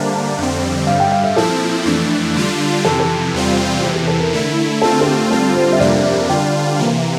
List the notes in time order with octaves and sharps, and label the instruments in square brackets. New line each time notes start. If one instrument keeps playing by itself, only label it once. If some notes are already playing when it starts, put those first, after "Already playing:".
Already playing: [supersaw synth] D3 G3 A#3 D4 [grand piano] C5 E5
[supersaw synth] F2 D3 G3 C4
[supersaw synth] G2 D3 G3 [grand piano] F5
[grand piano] G5
F5
E5
[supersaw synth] A#2 F3 C4 E4 [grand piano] A4
[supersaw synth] F2 E3 A3 D4
D3 G3 D4 F4
[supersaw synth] F2 C3 E3 [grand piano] A4
[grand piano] G4
A4
[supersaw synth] E2 C3 G3 C4 F4
[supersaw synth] E2 C3 E3 [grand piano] G4
[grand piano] G4
A4
A#4
[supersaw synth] D3 A3 E4
[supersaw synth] D3 A3 C4 F4 [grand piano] A4
[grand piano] A4
G4
[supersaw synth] D3 G3 C4 F4 [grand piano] A4
[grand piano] C5
E5
[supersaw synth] F2 C3 G3 A#3 D4 [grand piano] D5
[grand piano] E5
[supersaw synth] D3 G3 D4 F4 [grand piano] G5
[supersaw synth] C3 E3 A#3